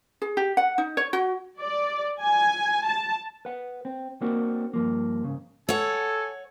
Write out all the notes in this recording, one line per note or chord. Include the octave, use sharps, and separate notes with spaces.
G#4
G4
F#5
D#4
C#5
F#4
D5
G#5
A5
B4 F#5
C4
A#3 C4 D4 F#4
G2 F3 A#3
G#2 C#3
A4 C#5 F#5 G#5